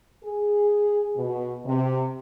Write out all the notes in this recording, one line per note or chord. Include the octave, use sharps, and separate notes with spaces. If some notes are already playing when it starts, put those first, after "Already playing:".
G#4
B2
C3